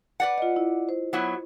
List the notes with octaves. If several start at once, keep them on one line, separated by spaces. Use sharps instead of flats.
B4 D5 F#5
F4 D#5
E4
C5
F#3 B3 E4